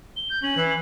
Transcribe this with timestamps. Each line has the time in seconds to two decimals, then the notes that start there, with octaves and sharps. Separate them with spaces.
0.16 G7
0.30 G6
0.43 C#4 F#7
0.57 E3